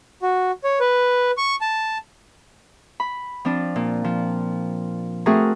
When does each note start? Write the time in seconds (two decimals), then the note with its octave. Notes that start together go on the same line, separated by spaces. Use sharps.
0.22 F#4
0.64 C#5
0.80 B4
1.38 C#6
1.61 A5
3.00 B5
3.45 F3 C4 D4
3.76 A#2
4.04 F3
5.26 A3 C4 F#4 G#4 A#4